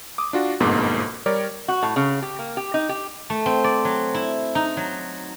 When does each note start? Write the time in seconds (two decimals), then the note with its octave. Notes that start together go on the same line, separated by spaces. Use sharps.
0.18 D6 D#6
0.33 D4 F4 F#4
0.60 G1 F2 G#2 B2 A#3 D6
1.26 G3 G4 A#4 C#5 D5
1.68 F#4
1.83 A2
1.96 C#3
2.22 G4
2.39 A#3
2.57 G4
2.74 D#4
2.89 G4
3.30 A3
3.46 C4
3.64 D5
3.85 F#3
4.14 E4
4.55 D#4
4.77 F#3